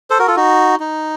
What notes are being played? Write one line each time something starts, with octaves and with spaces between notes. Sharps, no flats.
A4 C5
F#4 A#4
F4 A4
D#4 F#4
D#4